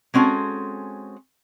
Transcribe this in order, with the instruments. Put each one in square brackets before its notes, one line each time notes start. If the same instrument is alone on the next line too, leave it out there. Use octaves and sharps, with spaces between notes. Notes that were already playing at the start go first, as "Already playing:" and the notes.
[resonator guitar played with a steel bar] G#3 C4 C#4 F#4 A4